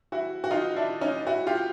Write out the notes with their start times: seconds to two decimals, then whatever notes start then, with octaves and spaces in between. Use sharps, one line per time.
0.12 E4 F#4
0.44 F#4
0.51 D#4 F4
0.76 D4 E4
1.01 C#4 D#4
1.27 E4 F#4
1.47 F4 G4